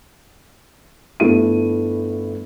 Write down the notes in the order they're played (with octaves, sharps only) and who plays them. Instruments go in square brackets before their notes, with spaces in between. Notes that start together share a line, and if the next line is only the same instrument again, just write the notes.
[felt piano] G1 A3 E4 D#7